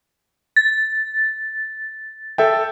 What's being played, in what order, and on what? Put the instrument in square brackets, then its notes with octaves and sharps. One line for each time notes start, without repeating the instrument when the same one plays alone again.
[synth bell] A6
[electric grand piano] A4 E5 G5